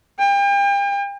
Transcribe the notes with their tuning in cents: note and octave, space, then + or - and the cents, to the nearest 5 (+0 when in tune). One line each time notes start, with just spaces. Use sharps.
G5 +40